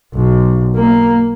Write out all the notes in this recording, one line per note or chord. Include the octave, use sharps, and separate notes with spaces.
B1
A#3